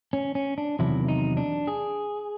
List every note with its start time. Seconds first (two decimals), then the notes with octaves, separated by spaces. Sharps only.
0.13 C#4
0.35 C#4
0.58 D4
0.79 E2 C3 D#3 F#3 E4
1.09 D#4
1.37 D4
1.67 G#4